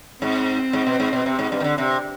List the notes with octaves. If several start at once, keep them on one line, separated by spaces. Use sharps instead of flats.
G#2 C4
G#2
B2
G#2
B2
C3
G#2
G2
D#3
D3
C3